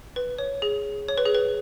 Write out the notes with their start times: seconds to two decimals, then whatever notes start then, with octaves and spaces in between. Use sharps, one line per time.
0.16 B4
0.38 C#5
0.62 G#4
1.08 C#5
1.18 B4
1.25 G#4
1.34 B4